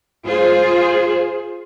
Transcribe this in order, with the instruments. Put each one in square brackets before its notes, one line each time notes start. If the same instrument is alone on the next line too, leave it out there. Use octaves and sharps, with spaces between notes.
[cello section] F4 G#4 C5